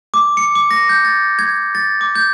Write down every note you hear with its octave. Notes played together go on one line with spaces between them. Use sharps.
D6
C#7
D6
A#6
G6
A6
G#6
A6
D6
G6